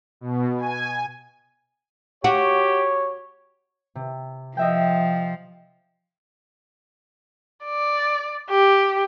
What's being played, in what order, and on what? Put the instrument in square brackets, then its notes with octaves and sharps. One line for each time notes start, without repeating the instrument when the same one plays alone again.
[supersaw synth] B2
G#5
[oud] F#4 [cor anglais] G4 [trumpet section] C#5
[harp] C3
[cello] F3 [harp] D#5 E5 G5
[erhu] D5
G4